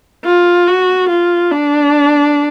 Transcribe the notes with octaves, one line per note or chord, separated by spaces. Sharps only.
F4
F#4
F4
D4